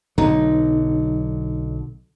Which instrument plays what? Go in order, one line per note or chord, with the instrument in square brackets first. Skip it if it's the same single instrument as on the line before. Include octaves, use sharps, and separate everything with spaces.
[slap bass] B1 D3 F#3 [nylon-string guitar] D#4